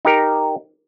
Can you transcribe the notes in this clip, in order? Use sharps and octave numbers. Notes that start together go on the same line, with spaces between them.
D#4 G4 A#4